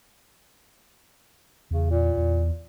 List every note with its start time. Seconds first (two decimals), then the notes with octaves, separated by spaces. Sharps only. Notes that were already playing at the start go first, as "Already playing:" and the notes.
1.71 E2 C#3
1.90 A#2
2.17 E2